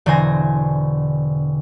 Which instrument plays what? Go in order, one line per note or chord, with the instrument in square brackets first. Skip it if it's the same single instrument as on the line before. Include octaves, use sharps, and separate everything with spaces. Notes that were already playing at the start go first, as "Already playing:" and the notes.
[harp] E1 D3 C5 G#5 A#6